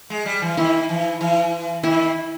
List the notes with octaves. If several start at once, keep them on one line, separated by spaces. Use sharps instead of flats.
G#3
G3
E3
D#3 E4
E3
E3
D#3 E4